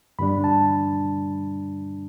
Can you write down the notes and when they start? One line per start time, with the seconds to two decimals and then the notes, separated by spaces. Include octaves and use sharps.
0.19 G2 D3 G3 D4 B5
0.44 A5